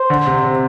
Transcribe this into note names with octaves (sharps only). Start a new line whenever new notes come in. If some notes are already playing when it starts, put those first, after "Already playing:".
Already playing: C5
D3
C3
C3